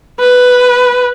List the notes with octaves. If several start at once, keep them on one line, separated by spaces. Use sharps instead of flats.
B4